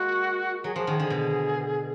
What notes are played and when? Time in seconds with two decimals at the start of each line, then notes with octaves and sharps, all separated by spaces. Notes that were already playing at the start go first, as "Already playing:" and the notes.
Already playing: G#3 A#3 F#4
0.64 F#3 G#4
0.76 F3 G#4
0.87 D#3 G#4
0.99 D3 G#4
1.10 B2